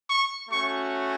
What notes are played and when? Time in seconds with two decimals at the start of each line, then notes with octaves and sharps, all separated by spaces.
0.09 C#6
0.49 A3 C#4 F#4 C#6